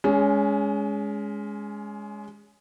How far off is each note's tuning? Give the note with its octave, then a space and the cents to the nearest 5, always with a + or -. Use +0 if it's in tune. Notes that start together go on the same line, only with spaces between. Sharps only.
G#3 +0 C#4 +25